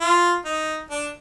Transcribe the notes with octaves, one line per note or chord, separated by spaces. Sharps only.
F4
D#4
D4